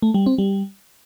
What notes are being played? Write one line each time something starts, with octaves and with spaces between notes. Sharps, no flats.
A3
G3
C4
G3